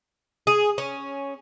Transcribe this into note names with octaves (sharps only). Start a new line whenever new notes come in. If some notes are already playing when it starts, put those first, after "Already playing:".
G#4
C#4